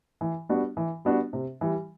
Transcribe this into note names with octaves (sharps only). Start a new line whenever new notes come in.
E3
G3 B3 D4 F#4
E3
G3 B3 D4 F#4
C3
E3 G3